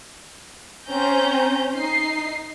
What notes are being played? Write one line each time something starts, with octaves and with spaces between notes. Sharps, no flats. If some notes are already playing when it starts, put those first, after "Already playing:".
C4 C#4 A#5 G6
D#4 C7